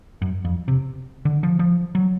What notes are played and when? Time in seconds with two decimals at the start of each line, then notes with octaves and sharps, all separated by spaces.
0.22 F#2
0.45 F2
0.68 C3
1.25 D3
1.43 F3
1.59 F3
1.95 F#3